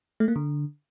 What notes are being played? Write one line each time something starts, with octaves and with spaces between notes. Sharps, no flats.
A3
A#3
D3